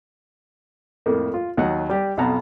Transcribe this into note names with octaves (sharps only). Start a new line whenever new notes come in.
F2 A2 A#3
F4
D#2 F#3 D#5 F#5
G3 G4 D5
B1 F2 B2 F#5 A5 A#5